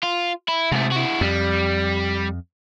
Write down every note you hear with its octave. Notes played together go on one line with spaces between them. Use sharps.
F4
E4
G#2 C3 A3
E4 F#4
F2 G3